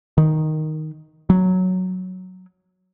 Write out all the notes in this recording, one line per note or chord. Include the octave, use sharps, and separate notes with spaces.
D#3
F#3